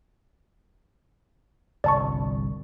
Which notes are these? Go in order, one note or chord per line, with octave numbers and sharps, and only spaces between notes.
G1 C2 D5 A5 C#6